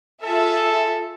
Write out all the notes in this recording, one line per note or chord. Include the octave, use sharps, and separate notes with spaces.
F4 G#4 A4 E5